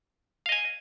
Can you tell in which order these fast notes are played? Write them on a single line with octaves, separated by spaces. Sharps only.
F5 D#5 G#5